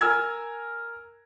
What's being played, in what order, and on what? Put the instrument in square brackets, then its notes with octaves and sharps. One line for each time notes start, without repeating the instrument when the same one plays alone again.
[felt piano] A#4 G#5 E6 F6 G#6